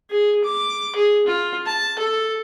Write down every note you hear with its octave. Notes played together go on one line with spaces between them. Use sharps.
G#4
D6
G#4
F4
A5
A4